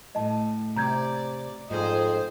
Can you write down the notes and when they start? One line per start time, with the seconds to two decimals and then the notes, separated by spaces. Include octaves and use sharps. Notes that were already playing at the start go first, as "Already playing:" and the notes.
0.15 A2 D#5 A5
0.76 C3 D5 A#5 G6 G#6
1.71 F2 G#2 F4 G#4 C5 D#5